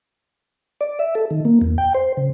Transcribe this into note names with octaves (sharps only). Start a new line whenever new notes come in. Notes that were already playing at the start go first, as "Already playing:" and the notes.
D5
E5
A4
D#3
A#3
E2
G5
C5
C#3